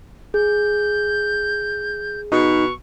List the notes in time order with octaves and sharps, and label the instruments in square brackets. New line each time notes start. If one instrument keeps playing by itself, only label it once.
[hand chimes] G#4 [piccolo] G6
[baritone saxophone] B2 [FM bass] D#4 [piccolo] C#6